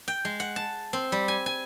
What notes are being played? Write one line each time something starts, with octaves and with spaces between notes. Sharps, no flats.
G5
G#3
F#5
A5
C4
G3
G#5
G#5